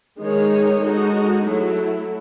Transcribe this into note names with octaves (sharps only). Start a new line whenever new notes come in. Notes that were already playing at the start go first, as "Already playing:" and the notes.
D#3 G#3 D#4 G#4 C#5
G#3 D#4 F#4 A4
F#3 A3 E4